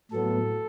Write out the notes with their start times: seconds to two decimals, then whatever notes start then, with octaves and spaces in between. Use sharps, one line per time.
0.11 A2 F#3 B3 A4